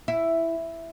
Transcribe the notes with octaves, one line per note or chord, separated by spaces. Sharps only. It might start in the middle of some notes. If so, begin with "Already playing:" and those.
E4